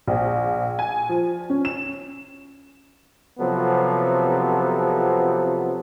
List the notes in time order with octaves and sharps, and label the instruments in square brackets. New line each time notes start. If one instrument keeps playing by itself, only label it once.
[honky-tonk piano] A#1
G#5
F3
C#4
E7
[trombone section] C3 F3 F#3 B3 A4